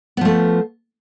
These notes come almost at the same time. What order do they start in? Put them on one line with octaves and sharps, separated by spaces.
B3 F3 A3